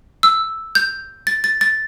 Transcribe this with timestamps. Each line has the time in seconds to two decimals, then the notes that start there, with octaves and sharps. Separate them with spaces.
0.23 E6
0.75 G6
1.27 A6
1.44 A6
1.61 A6